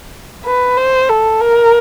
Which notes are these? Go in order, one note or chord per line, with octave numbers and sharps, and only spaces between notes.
B4
C5
A4
A#4